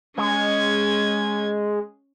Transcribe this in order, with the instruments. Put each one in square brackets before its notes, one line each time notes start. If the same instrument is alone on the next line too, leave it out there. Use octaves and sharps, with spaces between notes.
[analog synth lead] G#3 [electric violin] C#4 G#6